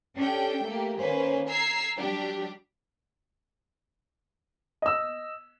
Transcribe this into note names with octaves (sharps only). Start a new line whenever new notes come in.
C#4 D4 G4 A4 G5
A3 A#3 G4
D#3 A#3 C#4 B4 C5
A#5 E6 G#6 C7
F#3 G3 D4 G4
D#5 E6